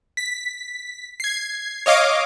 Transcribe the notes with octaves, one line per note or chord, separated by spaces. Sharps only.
B6
G#6 C7
C#5 D#5 F5 D6